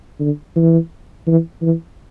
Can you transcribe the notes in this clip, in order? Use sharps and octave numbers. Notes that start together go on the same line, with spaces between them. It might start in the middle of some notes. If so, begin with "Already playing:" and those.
D3
E3
E3
E3